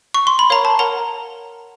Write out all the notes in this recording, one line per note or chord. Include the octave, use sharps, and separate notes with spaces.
C#6
C6
B5
A#4 C#5 F5 A#5
A5
A#4 C#5 F#5 A#5